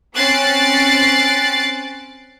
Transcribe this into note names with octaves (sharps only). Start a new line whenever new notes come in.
C4 C#4 F#6 A6 C7 D7